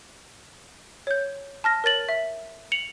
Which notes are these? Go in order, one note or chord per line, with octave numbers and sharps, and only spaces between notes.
C#5 G6
A5 F6 A#6
A#4 C#5 A6 F#7
E5
C#7 F7 F#7